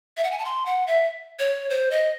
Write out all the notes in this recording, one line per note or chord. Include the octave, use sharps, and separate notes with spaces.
E5
F#5
G#5
A5
C6
F#5
E5
C#5
C5
D#5